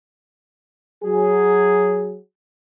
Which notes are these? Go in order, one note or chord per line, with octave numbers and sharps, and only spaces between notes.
F#3 G#4